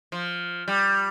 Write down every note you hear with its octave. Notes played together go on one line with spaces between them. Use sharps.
F3
G3